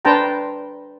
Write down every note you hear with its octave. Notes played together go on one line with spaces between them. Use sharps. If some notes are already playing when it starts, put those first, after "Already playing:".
D4 B4 C5 G5 A5 A#5